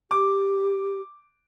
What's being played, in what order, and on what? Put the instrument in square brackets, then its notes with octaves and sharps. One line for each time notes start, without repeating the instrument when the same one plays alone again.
[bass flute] G4 [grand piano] D6